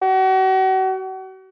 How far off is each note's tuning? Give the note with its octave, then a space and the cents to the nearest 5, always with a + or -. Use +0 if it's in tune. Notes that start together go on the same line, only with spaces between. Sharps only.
F#4 +40